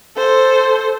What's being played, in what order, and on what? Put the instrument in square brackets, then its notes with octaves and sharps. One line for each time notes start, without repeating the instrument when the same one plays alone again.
[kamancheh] A4 C5